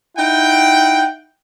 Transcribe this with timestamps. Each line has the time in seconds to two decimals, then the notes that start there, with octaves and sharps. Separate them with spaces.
0.18 D#4 E4 F#5 G5